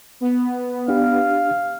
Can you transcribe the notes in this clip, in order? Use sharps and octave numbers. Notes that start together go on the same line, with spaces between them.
B3
D4 G4 F5